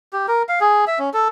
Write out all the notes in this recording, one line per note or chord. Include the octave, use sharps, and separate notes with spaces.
G4
A#4
F5
G#4
E5
C#4
A4